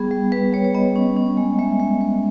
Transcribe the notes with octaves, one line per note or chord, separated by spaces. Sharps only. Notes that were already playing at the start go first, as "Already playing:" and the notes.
Already playing: G3 B3 G#4
G3
G3 B4
G3 C#5
C#5
B3 D#5
C#4
C#4
G#3
G#3 E5
G#3
G#3